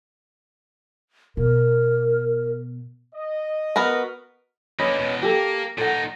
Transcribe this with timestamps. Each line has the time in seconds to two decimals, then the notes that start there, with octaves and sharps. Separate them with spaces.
1.37 B2 A#4
3.15 D#5
3.76 B3 F#4 A#4
4.79 D3 A#3 C#4 B4 D#5
4.99 E2 B2
5.22 A#3 G4 A4
5.78 A#2 D#4 A4 F#5